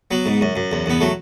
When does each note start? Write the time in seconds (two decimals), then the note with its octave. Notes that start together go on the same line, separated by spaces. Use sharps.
0.11 F#3 B3
0.26 G#2
0.41 F#2
0.56 F#2
0.72 E2
0.86 E2 B3
1.00 F#3 A3